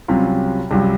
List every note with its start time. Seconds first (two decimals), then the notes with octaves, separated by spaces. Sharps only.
0.08 C2 C3 F#3 C#4 F4
0.71 C2 C3 F#3 C#4 F4